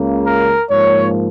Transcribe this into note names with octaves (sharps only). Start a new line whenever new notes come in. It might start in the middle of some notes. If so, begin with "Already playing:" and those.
Already playing: C#2 C#3 A#3
A#4
G#2 F3 A#3 C#5